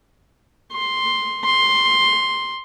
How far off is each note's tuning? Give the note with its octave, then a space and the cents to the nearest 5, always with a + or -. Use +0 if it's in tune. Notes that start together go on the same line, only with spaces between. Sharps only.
C6 +5
C6 +5